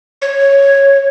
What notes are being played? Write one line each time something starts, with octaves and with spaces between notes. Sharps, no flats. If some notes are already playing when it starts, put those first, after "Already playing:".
C#5